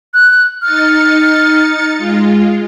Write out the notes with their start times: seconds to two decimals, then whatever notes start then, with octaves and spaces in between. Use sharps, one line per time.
0.14 F#6
0.62 D#4 F6 A6 C#7
1.98 G#3 F4